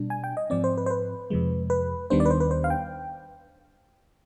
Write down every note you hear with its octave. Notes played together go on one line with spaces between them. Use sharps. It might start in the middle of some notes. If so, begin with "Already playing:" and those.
Already playing: B2 G3 D4
G#5
G5
D#5
G#2 F3 C4 D5
C5
B4
C5
B4
F2 C3 F3 G#3
B4
D#2 D#3 G3 B3 D4 C5
D5
B4
C5
B4
C5
F5
G5